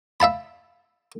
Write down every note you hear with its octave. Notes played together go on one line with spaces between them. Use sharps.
E5 F5 A5 B5